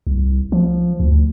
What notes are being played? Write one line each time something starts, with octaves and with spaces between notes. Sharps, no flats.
C2
F3
D2